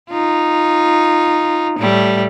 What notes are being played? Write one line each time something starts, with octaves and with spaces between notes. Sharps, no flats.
D#4 F4
A2 G3 A3